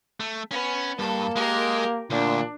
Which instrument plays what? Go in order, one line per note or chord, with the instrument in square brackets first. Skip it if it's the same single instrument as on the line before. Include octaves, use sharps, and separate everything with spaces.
[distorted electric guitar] A3
[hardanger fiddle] B3 [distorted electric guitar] C#4
[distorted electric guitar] G2 [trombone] A#3 [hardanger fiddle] A4
[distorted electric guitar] G#3 [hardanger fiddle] G4 A#4
[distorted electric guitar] D2 [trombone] A#2 [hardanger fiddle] D4